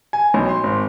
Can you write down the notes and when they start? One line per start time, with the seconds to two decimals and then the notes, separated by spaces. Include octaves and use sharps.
0.13 G#5
0.34 B1
0.49 C6
0.63 G#1